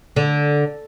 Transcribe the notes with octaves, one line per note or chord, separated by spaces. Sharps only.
D3